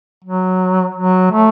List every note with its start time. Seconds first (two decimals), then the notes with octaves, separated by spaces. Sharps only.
0.24 F#3
0.96 F#3
1.32 A3